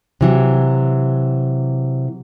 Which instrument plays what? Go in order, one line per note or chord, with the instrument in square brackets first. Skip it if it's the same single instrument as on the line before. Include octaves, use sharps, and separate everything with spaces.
[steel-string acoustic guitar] C3 E3 F#3